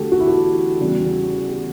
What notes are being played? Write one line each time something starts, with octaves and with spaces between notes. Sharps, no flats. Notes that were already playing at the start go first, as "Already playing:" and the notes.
Already playing: E2 D3 A3 F#4 G4 A4
F#4
E4
F#4
E2 C#3 G3
G4